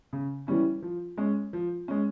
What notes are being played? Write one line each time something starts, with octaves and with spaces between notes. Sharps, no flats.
C#3
E3 G3 C#4 E4
F3
G#3 C#4
F3
G#3 C#4